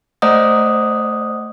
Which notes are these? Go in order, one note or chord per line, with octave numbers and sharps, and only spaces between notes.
A3 C5 D5 D#5 F#5 D#6